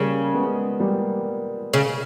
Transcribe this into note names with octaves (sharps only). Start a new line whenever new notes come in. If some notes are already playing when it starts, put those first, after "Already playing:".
Already playing: C#3 G3 A#3
G#3 B3
G3 A#3
C#3